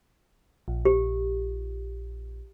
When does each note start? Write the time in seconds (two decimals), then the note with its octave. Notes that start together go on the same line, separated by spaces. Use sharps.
0.68 A#1
0.85 G4